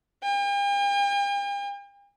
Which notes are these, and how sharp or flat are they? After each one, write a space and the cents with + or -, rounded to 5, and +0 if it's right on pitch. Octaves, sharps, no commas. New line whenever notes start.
G5 +45